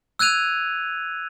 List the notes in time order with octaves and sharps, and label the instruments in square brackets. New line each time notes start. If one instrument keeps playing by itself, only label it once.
[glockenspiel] E6 F#6 G#6 D#7 F7